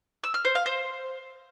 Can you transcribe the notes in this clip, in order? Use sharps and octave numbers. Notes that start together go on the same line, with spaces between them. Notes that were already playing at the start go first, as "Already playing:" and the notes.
E6
F6
C5
F5
C5